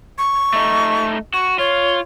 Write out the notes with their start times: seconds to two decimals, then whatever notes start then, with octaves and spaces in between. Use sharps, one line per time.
0.18 C#6
0.53 A3 D#4
1.34 F#4 C#6
1.59 F4 C#5